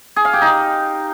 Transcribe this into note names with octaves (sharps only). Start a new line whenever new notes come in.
G#4
F5
G4
D#4